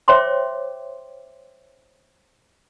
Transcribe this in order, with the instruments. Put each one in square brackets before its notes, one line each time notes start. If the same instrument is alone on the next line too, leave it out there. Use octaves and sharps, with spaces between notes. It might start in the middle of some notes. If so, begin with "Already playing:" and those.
[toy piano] C5 C#5 E5 G5 C6 D6